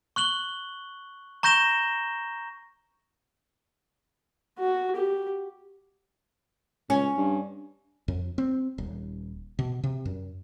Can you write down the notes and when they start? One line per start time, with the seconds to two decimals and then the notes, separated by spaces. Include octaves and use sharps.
0.16 C#6 F#6 F#7 G7
1.43 A#5 C#6 G6 A#6 E7 G7
4.59 F#4
4.96 G4
6.90 C#2 C#4
7.17 G2
8.08 F2
8.38 C4
8.78 D#1
9.59 B2
9.84 C3
10.05 F#2